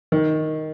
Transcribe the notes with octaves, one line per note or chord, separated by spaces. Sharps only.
D#3